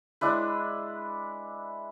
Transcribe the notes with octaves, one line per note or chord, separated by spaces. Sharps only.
G#3 D4 E4 B4